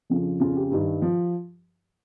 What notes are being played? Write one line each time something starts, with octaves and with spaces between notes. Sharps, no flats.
F2 C#3 F3
F2 C#3 F3 F4
G4
G2 D#3
F3